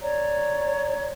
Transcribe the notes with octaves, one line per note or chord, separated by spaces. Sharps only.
C#5 D5 A#5